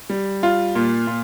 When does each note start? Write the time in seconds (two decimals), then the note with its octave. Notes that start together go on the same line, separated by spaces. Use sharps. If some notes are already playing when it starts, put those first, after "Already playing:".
0.10 G3
0.43 F4
0.75 A#2
1.07 A#2